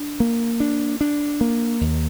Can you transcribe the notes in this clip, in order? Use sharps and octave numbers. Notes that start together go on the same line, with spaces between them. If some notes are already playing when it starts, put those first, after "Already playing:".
Already playing: D4
A#3
D4
D4
A#3
D#2